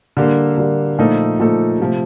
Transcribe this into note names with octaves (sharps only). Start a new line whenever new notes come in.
D3 G3 A#3
D3 G3 A#3
A#2 F3 A3 D#4 A4
A#2 F3 A3 D#4 A4
C3 F3 A3